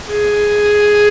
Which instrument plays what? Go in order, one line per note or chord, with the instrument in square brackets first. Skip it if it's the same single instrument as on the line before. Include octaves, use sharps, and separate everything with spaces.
[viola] G#4